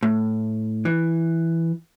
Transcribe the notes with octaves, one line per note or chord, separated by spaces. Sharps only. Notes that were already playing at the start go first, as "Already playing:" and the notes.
A2
E3